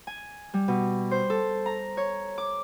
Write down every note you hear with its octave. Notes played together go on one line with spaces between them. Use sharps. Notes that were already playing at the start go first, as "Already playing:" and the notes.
G#5
G3
B2
C5
A4
A#5
C#5
D6